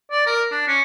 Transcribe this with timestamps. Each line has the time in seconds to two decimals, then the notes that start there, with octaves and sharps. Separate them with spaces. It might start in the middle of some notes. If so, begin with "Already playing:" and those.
0.11 D5
0.27 A#4
0.52 D4
0.68 C#4